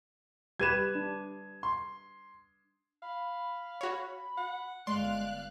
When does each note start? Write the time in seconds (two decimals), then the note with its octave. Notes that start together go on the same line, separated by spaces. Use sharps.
0.60 G3 G4 B4 G#6 D#7 E7
0.95 D4
1.63 C6
3.02 F5 B5
3.81 F#4 C#5
4.38 F#5
4.87 G1 G#3 D5 F5 C6 F#6